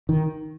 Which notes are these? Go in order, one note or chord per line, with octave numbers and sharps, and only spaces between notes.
D#3